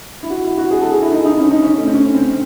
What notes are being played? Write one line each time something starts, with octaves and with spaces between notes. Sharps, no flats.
E4
F#4
E4
F#4
G#4
A4
G#4
E4
D#4
D#4
C#4
D#4
C#4
A3
C4
C#4
C4